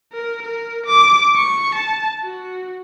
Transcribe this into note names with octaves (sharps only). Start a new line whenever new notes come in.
A#4
A#4
D6
C#6
A5
F#4